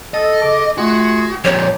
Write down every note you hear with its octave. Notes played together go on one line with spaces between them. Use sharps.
A4 D#5
C#3 A4 D6
A3 F4 F#4 G#4
F2 A#2 G4 C#5